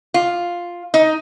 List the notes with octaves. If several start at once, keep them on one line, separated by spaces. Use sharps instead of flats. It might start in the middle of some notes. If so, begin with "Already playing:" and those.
F4
D#4